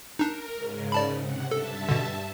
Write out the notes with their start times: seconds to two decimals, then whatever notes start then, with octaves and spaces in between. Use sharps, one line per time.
0.19 D4 D#4 A#4
0.54 G#2 C#3
0.92 D5 A5 B5
1.21 C3 F#5
1.51 G2 A4 E5 A5
1.89 B2 D3